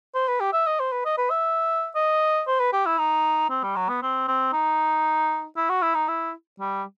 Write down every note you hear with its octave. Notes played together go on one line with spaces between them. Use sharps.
C5
B4
G4
E5
D#5
C5
B4
D#5
B4
E5
D#5
C5
B4
G4
E4
D#4
C4
G3
F#3
B3
C4
C4
D#4
E4
F#4
E4
D#4
E4
G3